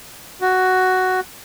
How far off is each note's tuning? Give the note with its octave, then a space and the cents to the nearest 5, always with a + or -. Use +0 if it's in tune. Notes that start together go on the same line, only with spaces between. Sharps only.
F#4 +5